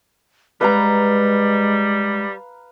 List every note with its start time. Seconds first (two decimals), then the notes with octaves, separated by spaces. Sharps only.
0.61 G3 G#3 B4 F5 A#5